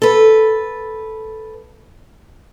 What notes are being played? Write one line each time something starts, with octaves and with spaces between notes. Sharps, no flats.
A4 B4